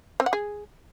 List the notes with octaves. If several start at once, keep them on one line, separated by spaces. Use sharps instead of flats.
C4
F#5
G#4